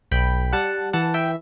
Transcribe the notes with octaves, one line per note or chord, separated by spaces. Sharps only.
B1 G5 B5
G3 F#5 A5
E3 F#5 A5
E5 G5